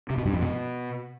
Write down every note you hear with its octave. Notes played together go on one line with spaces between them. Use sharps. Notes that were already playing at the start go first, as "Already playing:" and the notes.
C3
B2
G2
F2
B2